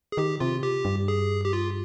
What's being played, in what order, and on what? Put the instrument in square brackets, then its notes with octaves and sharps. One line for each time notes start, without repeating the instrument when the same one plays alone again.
[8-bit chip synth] G#4
[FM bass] D#3 [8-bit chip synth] G4
[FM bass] C3 [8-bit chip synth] F4
[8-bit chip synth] G4
[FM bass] G2
[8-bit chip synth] G#4
G4
F4